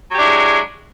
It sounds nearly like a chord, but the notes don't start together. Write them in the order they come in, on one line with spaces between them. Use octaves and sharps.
F#3 G4 D4 E4 G#3